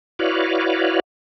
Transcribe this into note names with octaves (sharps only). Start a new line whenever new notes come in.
E4 F#4 B4 C#5 D5 F5